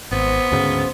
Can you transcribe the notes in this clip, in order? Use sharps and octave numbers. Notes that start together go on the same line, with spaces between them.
G#1 B3 C5
D2 G#2 C#3